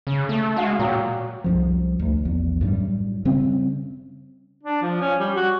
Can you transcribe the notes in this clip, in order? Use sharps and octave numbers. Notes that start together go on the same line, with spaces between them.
C#3
A3
G#3 F#4 F5
A#2 F#3 G4
C2 F#2 F3
D2
A#1 E2
F#2 A2 F#3 G3
C#3 G3 C4 C#4
D4
F3
C#4
G3
F#4